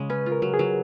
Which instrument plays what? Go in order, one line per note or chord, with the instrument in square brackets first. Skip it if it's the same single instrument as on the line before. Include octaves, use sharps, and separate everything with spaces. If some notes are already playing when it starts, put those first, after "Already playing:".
Already playing: [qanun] C#3 G#3
[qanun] C#4 [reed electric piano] B4
[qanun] F4
[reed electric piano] A#4
[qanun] F#3
[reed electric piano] G#4
[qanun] F#3